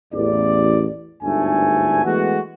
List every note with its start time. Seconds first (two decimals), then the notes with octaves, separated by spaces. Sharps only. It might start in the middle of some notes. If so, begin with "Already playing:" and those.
0.14 A1 E2 D5
1.23 G1 D2 G#2 D3 A3 G#5
2.05 E3 G#3 A3 B3 F#4